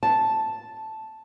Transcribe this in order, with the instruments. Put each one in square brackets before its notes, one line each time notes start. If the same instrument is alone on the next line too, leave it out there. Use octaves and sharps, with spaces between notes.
[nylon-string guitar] A5